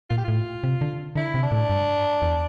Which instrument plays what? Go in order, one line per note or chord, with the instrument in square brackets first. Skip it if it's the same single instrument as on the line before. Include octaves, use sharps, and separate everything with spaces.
[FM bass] A#2 [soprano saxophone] F4
[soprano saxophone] G4
[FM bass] A2 [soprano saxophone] F4
[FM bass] C3
D3
[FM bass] D3 [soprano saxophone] E4
[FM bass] C3
[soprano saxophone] D4
[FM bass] A2
G2
E2